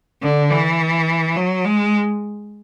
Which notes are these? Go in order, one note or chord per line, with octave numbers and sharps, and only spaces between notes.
D3
E3
F#3
G#3